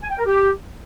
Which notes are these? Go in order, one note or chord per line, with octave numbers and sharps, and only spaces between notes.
G#5
G5
A#4
G4